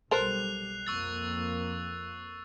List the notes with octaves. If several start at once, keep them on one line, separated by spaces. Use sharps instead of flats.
B1 G3 A4 A#4 C5 F#6 C7 F7
F2 A#3 C#6 E6 A6